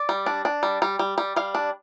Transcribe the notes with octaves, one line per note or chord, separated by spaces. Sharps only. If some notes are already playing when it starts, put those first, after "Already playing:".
Already playing: D5
G3
D4
D4
G3
G3
G3
G3
G3 F5
D4